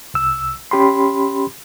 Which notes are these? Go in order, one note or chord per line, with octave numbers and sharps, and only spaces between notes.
C2 E6
C#4 G4 B5 C6